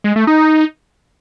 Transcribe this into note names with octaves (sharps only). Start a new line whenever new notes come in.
G#3
A3
D#4